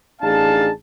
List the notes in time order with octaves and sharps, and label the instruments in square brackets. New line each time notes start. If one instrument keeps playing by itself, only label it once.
[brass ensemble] A1 D4 D#4 G#4 F5 A5